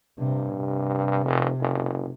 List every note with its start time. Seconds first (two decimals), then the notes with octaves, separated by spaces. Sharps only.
0.18 G2 C3
0.56 C3
1.25 F1
1.61 F#1